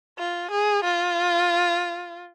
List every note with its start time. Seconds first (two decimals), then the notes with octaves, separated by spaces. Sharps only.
0.19 F4
0.51 G#4
0.84 F4